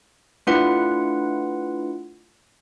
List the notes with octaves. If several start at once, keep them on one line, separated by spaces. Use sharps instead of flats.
A3 D4 E4 F4 B4 F#5